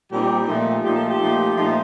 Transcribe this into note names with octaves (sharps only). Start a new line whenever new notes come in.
A#2 G3 C4 D#4 G4
A#2 F3 A3 D#4
A#2 F3 A3 D#4 G4
A4
G4
A#2 F3 A3 D#4
A#2 F3 A3 D#4